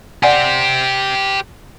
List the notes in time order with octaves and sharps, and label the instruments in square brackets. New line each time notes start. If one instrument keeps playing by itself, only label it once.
[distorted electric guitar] G4 C5 [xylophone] D5 F#5 G#5